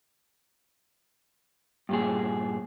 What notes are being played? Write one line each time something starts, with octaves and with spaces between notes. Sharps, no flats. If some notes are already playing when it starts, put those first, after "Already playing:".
G2 A#2 G#4